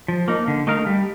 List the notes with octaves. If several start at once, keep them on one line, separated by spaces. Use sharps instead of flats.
F3
A#3 D#4
D3
A3 D#4 A#4 F5
G3